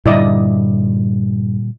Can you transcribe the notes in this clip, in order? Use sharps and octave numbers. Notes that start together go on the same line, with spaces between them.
G2 A#2 D3 G3 E4 D5 D#5